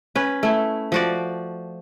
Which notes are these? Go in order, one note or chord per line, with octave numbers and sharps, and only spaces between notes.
C#4 B4
A3 E4
F3 F#4 D5